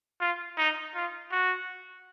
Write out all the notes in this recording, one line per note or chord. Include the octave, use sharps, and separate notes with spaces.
F4
D#4
F4
F#4